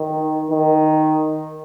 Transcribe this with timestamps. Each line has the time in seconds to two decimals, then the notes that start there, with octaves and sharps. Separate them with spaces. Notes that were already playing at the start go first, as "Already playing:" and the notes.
Already playing: D#3
0.50 D#3